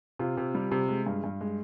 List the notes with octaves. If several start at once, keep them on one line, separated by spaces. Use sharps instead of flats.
C3 F4
C3
G3
C3
G#3
G2
G2
G#3